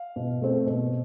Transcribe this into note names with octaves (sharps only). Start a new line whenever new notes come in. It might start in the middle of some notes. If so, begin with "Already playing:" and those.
Already playing: F5
B2
A3 C4
B2